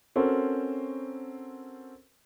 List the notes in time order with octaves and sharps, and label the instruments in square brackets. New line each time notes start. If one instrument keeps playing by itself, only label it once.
[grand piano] C4 C#4 F#4 A4 A#4 C5